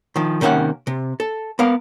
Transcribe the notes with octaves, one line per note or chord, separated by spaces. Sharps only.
D#3 F3
C3 D#3 A#3 C#4 E5 F#5
C3
A4
B3 A#4 F5